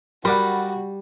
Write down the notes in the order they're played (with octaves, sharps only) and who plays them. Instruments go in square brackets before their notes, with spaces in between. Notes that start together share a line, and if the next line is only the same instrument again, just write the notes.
[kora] G3 [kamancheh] F#4 [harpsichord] A#4 D5 F#5 [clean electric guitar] B5